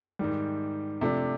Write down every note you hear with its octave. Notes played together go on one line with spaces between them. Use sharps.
G#2 D#3 G3
C3 F3 A3 D4